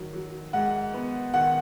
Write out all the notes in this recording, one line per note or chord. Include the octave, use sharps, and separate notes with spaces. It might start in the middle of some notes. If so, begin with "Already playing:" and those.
Already playing: D#3 F#3
F#3
G#2 F#5
B3
D#3 F#5